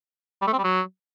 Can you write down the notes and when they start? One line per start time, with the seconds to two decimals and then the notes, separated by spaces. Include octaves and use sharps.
0.41 G3
0.47 A3
0.53 C4
0.58 G3
0.64 F#3